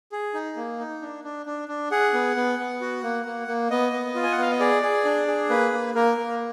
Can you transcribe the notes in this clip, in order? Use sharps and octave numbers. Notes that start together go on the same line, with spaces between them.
G#4
D#4
A#3
D#4
D4
D4
D4
D4
G#4 F#5
B3
B3
B3
F#4
A#3
A#3
A#3
B3 D#5
B3
F4
G#5
F#5
B3 F5
D#5
G#4 D5
G#4
D4
G#4
A#3 B4
A#3
A#3 A#4
A#3